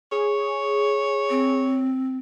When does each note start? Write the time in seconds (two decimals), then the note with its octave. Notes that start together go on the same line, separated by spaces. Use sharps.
0.12 G#4 C#5
1.30 C4